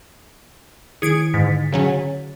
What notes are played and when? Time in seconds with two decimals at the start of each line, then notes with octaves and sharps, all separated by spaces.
1.02 D#3 E4 G#4 G#6 C#7 D7
1.34 G#2 D3 A6 B6
1.72 C#3 F#3 C#4